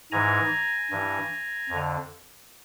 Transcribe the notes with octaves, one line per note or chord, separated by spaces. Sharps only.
G#2 E3 G#5 A#5
G2 E3
F2 D3